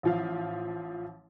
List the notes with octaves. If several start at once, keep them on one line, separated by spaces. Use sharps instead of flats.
A1 F3 F5